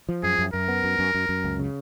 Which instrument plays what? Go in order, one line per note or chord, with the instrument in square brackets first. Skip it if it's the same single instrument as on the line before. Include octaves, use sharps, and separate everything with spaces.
[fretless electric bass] F3
[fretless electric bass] F#2 [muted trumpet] G#4
[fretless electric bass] F#2
[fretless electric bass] F#2 [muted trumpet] A#4
[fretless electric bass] B3
F#2
F#2
F#2
F#2
C#2
C#3